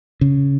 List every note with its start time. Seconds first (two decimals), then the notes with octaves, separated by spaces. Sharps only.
0.21 C#3